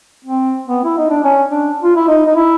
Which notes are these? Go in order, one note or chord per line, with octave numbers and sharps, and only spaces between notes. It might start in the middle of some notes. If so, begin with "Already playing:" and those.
C4
B3
E4
D#4
D4
C#4
D4
F4
E4
D#4
D#4
E4